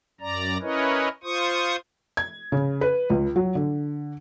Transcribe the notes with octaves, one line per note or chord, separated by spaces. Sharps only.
F#2 D5 A#5
C#4 E4 A#4 B4 C#5 D#5
F4 C5 C#6 D#6
G#6
C#3
B4
C#2
F#3
D3